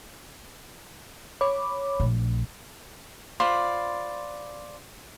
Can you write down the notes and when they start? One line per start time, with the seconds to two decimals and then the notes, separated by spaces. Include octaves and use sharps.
1.41 C#5 B5 D6
2.00 A#1 A3
3.40 F4 C5 D5 B5